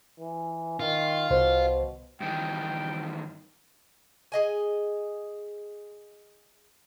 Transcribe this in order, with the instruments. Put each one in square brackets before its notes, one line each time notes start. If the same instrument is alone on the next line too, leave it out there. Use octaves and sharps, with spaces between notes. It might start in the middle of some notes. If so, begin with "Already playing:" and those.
[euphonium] E3
[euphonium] D#3 [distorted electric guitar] F4
[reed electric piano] C2 C5 [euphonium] B2
[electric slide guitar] G2 D#3 E3 [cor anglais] G5
[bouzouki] G#4 D#5 G#5